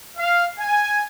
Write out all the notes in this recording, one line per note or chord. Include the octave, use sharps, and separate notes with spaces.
F5
G#5